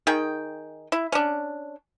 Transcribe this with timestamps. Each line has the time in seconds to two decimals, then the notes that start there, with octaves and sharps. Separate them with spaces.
0.07 D#3 G#4 G5
0.92 E4
1.12 C#4 D4